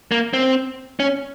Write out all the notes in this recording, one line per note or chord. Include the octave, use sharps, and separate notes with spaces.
A#3
C4
C#4